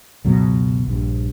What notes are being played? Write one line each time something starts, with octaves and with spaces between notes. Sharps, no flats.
C#2 F#2 B2 F#3
A#1 G2